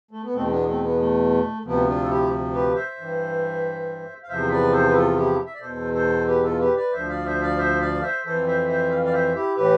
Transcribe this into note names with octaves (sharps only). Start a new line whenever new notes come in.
A3
B3
E2 B2 A3 C4
C4
B3 D4
A3 C4
B3
A3
D2 C3 F3 B3
D4 F4
A4
E4 G4
G4 B4
C5 E5
G2 E3
F5
E2 C3 F3 C5 E5
B4 D5
A4 C5
B4
F4 A4
E4 G4
E5
D5
E2 B2 A4 C5
A4 C5
G4 B4
F4 A4
G4 B4
B4 D5
D2 D3 F3 C5 E5
D5 F5
C5 E5
D5 F5
C5 E5
D5 F5
C5 E5
F2 E3 A4 C5
C5 E5
C5 E5
F5
D5 F5
C5 E5
E4 G4
A2 E3 G4 B4